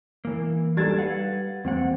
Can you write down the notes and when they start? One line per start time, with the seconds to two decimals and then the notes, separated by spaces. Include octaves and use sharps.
0.25 E3 A#3
0.77 G3 D4 D#4 A4 G#6 A6
0.98 B4 F5 F#5
1.65 E2 A#3 C4 F#5